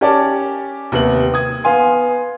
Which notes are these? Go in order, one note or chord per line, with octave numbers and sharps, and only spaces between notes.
C#4 G4 A#4 C#5 D5 A5
D#2 C3 B3 F#7
D#6 G#6
B3 F5 G#5 C6